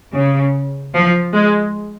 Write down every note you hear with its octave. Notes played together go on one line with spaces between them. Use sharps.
C#3
F3
G#3